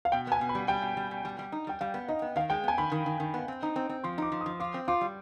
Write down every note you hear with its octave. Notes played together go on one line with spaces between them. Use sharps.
F5
B2 G5
B3 G#5
B2
B5
G3
G3 G5
B2
G3
B2
G3
G3
D#4
G3 G5
G3 F5
B3
D#4 D#5
B3
D#3 F5
G#3 G5
B3 G#5
D#3 B5
D#3
D#3
D#3
B3
C4
D#4
C4
C4
F3 C6
D#4 D6
F3
D#6
F3
F4 D6
C4
F4 D6
G3